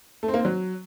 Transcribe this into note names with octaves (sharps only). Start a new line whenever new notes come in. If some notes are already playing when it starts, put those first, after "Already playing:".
A3
C4
A#3
C4
F#3